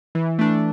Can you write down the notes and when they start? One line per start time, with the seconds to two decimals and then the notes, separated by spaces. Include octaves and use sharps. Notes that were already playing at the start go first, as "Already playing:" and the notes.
0.15 E3
0.39 A3 D4